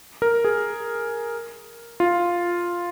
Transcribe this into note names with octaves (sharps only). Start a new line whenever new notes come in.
A#4
G#4
F4